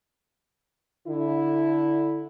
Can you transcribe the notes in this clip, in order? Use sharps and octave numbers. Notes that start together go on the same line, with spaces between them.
D3 E4